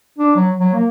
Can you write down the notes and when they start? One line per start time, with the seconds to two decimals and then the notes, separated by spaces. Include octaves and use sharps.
0.18 D4
0.36 F#3
0.58 F#3
0.73 A#3